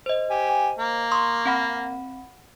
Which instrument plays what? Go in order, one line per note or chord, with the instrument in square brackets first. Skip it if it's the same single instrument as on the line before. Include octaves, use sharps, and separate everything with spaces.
[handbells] C5 D#5
[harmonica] G4 G#5
A#3
[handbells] C6 C#6 D#6
C4 F#5 B5